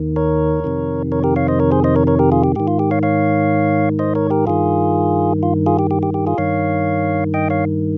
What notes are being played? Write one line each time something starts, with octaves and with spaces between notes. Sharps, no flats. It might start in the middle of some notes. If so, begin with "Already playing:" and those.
Already playing: D#2 D#3
A#4 C#5
F2 C3 D#3
A#4 C#5
G4 A#4
C#5 F5
C5 D#5
A#4 C#5
G#4 C5
C5 D#5
A#4 C#5
A#4 C#5
G4 A#4
F4 G#4
G4
G#2 D#3 G4
F4
G4
C#5 F5
C#5 F5
C5 D#5
A#4 C#5
G4 A#4
G2 D#3 F4 G#4
F4
F4 G#4
G4
G4
G4
G4
F4 G#4
G2 D#3 C#5 F5
D#5 G5
C#5 F5